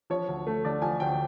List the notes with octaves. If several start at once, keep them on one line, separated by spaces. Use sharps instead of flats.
F3 C#5
D2
A3
D3 D5
F3 G#5
D2 G5